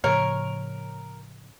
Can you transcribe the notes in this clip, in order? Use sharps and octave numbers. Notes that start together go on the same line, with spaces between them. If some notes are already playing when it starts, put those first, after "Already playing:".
A2 C#3 F3 A#4 C#5